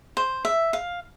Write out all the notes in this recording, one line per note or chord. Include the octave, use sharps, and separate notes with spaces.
C5
E5
F5